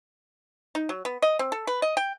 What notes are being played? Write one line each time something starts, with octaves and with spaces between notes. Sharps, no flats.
D#4
F#3
B3
D#5
C4
A4
B4
D#5
G5